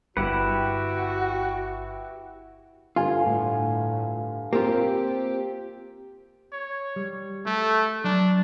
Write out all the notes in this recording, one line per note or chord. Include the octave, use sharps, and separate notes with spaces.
G1 E4 F#4 G4 B4 F#5
G2 D3 F4 F5 G#5
A2
A#3 C4 F4 G4
C#5
G3
A3 A4
F#3 D4 D5 A#5